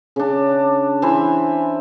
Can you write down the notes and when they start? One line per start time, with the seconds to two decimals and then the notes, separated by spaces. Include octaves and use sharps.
0.16 C#3 D4
1.02 E3 C5 E5 B5